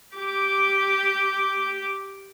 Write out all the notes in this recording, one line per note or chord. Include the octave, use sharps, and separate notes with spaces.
G4 D6